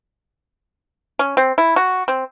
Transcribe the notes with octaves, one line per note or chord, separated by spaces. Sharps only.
C#4
C4
E4
F#4
C4